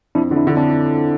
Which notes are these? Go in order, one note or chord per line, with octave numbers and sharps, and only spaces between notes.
F2 D4 E4
D3
D4 E4
D3
C4 D4